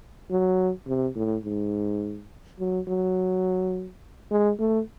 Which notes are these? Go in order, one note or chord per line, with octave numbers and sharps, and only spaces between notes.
F#3
C3
A2
G#2
F#3
F#3
G#3
A3